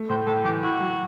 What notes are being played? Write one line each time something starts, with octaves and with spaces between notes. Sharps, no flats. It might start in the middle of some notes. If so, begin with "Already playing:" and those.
Already playing: A3
A2 C5
A2 A4
E3 G4
E4 F#4
F#3